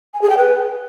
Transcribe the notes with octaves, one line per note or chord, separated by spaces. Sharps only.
G#5
G#4
G5
B4